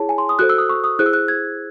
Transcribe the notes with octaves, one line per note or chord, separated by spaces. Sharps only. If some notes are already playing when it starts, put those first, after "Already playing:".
Already playing: E4 G#4 C#5 A5
G#5
C6
D#6
F#4 A4 C5 F#6
E6
D#6
C#6
D#6
E4 G#4 C5 F#6
E6
F#6
G#6